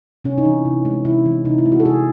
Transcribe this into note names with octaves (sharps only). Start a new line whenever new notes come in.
C3 C#4
D#4
E3
C3
G#3
C3 E4
E3
C3 D#4
E4
G#3
F#4
A4
C3 G#4